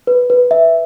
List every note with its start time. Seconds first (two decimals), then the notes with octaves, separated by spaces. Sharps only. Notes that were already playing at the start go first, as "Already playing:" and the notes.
0.07 B4
0.30 B4
0.51 E5